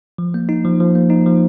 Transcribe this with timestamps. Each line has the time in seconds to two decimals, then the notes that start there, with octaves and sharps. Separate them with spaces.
0.18 F3
0.34 A#3
0.49 D#4
0.65 F3
0.80 F3
0.95 A#3
1.10 D#4
1.26 F3